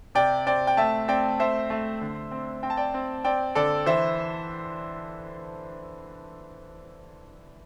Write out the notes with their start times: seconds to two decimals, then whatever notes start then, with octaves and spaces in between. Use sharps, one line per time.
0.15 C3 D5 G5
0.46 C4 D5 G5
0.67 G5
0.77 A3 E5 A5
1.08 C4 D5 G5
1.39 A3 C5 E5
1.70 A3
2.01 D3
2.31 C4
2.63 C4 G5
2.70 A5
2.77 D5 G5
2.94 C4
3.24 C4 D5 G5
3.55 D3 A4 D5
3.86 E3 C5 E5